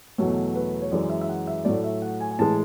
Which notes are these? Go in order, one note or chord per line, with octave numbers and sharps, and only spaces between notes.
E2 B2 F#3 A3 C#5
B4
C#5
F#2 E3 G#3 D5
E5
E5
F#5
E5
A2 F#3 A3 D5
E5
F#5
G#5
G#5
A2 E3 G#3 A5